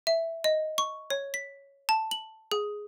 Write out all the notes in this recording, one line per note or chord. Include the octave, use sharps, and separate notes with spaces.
E5
D#5
C#6
C#5
B6
A5
F#7
G#4